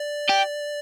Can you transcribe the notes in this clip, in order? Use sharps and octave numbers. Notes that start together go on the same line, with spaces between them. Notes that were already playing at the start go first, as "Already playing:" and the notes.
Already playing: D5
G4